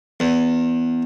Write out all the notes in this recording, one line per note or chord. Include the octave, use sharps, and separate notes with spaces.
E2